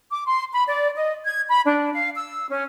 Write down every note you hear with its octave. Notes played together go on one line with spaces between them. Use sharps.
D6
C6
B5
D5
D#5
G#6
B5
D4
F5
E6
C#4